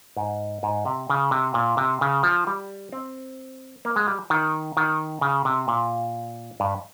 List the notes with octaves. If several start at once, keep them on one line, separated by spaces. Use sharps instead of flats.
G#2
G#2
C3
C#3
C3
A#2
C3
C#3
F3
G3
C4
A#3
G#3
G3
D#3
D#3
C#3
C3
A#2
G2